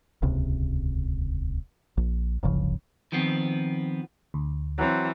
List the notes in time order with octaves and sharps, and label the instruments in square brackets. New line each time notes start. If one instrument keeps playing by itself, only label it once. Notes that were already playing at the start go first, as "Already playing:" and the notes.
[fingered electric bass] D#1 C#2 C3
A#1
D1 G1 C#3 F3
[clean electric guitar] D#3 F3 B3 C4
[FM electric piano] D2
[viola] E3 [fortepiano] F#3 C4